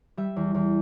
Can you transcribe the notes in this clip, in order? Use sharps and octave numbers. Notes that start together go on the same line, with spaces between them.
G3 E5
E2
E2